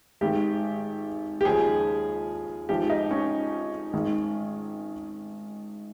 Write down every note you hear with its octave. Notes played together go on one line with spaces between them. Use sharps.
G#1 G#2 D#3 G4
G4
D#2 C#3 F3 G#4
G#1 G#2 F3 G4
D#4
C#4
G#1 G#2 D#3